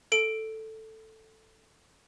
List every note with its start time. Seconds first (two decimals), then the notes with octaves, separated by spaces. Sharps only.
0.12 A4 D7